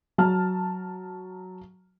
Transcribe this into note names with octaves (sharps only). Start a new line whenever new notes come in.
F#3 A5 F6